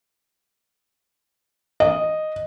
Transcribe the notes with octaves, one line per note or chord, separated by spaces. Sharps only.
D#5